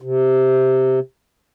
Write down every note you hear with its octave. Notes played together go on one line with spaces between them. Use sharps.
C3